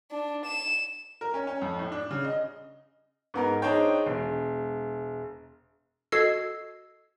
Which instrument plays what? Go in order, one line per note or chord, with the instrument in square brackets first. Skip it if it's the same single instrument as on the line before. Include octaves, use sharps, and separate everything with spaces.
[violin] D4
E7
[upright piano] A#4
C#4
C#4
F2
A2
D4
C#3
D#5
G#2 B3 A#4
D4 D#4 G#4 C5 C#5 G5
E1
[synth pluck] F#4 A4 D#5 E6 G#6 C7